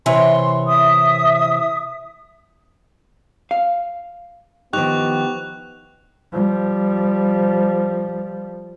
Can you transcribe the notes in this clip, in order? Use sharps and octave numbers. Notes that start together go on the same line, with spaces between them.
C3 E3 C#5 C6
E5 D#6
F5
D#3 F3 B3 D#4 G4 C#6 F#6 F7
F3 G3